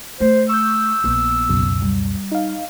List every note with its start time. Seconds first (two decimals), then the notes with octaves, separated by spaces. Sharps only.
0.20 A3 C5
0.50 C#6 E6 G6
1.04 A#1 B3
1.49 C#2 F#2 B2
1.82 G3
2.32 D#4 F5